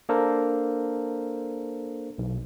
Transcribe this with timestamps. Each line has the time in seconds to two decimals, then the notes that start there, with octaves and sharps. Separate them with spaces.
0.09 A#3 D4 A4 A#4 C5
2.18 B1